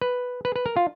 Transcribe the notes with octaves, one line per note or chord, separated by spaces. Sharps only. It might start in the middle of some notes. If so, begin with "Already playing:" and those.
B4
B4
B4
A#4
F4